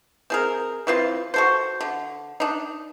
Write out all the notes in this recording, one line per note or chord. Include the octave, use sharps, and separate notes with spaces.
C4 G#4 A#4
E3 C4 F4
F#4 A4 C5
D3
D4 D#4